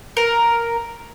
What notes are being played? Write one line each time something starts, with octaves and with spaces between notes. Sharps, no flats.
A#4